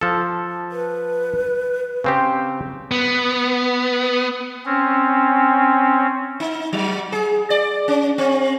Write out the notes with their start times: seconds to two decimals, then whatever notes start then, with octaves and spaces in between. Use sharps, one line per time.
0.01 F3 A4
0.72 B4
2.04 C#3 C4 G4
2.91 B3
4.66 C4 C#4
6.40 D#4
6.73 F#3
7.12 G#4
7.50 D5
7.88 C#4
8.18 C4